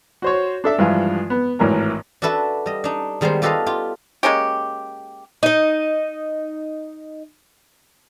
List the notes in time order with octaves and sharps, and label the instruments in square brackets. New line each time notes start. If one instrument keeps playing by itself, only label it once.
[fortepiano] F#4 C5 C#5
D4 A4 E5
G2 E3 F3 G#3 F4 E5
B3
G#1 A2 E3 A#4 A#5
[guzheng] D4 F#4 A4 B4 E5
G3 D#5
D4 D#4
D#3 G3 G#3 B3 D#4 C5
F4 G4 A4 B4 D#5 F5
F4 G4
[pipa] G#3 A#3 C#4 G4
[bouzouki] D#4 D#5